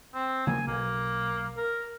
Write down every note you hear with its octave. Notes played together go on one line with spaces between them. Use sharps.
C4
C#3 F3 A#3 G#5
B1 A#3
A#4